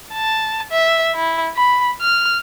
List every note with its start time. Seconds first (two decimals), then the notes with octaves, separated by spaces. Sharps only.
0.14 A5
0.71 E5
1.15 E4
1.56 B5
2.01 F6